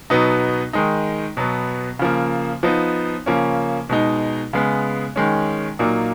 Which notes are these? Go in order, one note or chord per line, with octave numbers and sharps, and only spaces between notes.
B2 F#3 B3 D#4
D#3 G#3 D#4
B2 F#3 B3
C#3 F3 A#3
F3 B3 D#4
C#3 F3 A#3 C#4
B2 G#3 D#4
C#3 G#3 B3
D#3 G#3 C#4
A#2 F#3 A#3 D#4